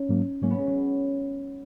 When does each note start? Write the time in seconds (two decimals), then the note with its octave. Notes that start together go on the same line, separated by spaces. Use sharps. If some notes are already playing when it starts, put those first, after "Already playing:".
Already playing: C#4 D#4
0.09 G#2 F#3 A#3
0.42 G#2 F#3 A#3 C#4
0.50 B3
0.58 G#3
0.67 F#3